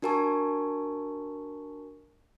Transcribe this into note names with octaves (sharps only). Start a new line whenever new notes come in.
D4 F#4 A#4 G#5 A5 C#6